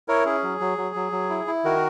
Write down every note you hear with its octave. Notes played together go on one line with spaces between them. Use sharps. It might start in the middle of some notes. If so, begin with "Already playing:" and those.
E4 A#4 C#5
C#4 G#4
F#3
F#3
F#3
F#3
F#3
E4
E4
D#3 F#4 A#4